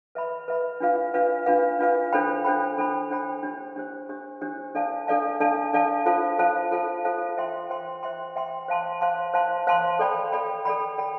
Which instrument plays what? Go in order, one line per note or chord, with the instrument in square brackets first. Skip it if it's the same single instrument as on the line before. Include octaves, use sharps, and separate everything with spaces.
[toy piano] B4 E5 B5
B4 E5 B5
D4 F4 B4 F5
D4 F4 B4 F5
D4 F4 B4 F5
D4 F4 B4 F5
D4 A4 C5 G5 B5
D4 A4 C5 G5 B5
D4 A4 C5 G5 B5
D4 A4 C5 G5 B5
D4 G4 C5
D4 G4 C5
D4 G4 C5
D4 G4 C5
D4 A4 D5 F5 A5
D4 A4 D5 F5 A5
D4 A4 D5 F5 A5
D4 A4 D5 F5 A5
F4 A4 C5 F5 A5
F4 A4 C5 F5 A5
F4 A4 C5 F5 A5
F4 A4 C5 F5 A5
C5 E5 G5 C6
C5 E5 G5 C6
C5 E5 G5 C6
C5 E5 G5 C6
C5 F5 A5 C6
C5 F5 A5 C6
C5 F5 A5 C6
C5 F5 A5 C6
A4 D5 G5 B5
A4 D5 G5 B5
A4 D5 G5 B5
A4 D5 G5 B5